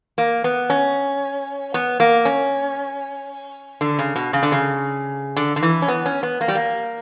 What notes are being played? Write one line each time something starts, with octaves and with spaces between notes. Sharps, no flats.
A#3
B3
C#4
B3
A#3
C#4
D3
C#3
B2
C#3
D3
C#3
D3
D3
E3
C#4
B3
C#4
B3
A#3
G3
A#3